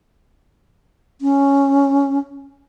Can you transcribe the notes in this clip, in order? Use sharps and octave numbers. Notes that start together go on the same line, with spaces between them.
C#4